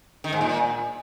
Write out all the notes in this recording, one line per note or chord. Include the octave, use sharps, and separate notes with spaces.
D#3
G#2
A#2